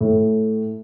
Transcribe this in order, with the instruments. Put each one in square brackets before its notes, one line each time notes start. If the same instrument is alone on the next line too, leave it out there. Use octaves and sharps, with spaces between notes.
[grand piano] A2